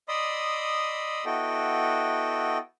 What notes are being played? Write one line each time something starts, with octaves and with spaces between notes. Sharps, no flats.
D5 D#5 B5 C6 D#6 E6
B3 E4 F#4 A4 D#5 G5